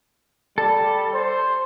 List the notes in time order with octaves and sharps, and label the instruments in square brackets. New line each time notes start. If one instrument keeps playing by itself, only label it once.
[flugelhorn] G3 [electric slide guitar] A4
[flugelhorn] C5